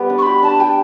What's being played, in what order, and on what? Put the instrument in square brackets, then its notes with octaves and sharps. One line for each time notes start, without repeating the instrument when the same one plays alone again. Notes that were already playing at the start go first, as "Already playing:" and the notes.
Already playing: [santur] G3 B3 G4
D4
[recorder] C#6
[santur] G4 [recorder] B5
[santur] D4 [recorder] A5
[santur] G4 [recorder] G5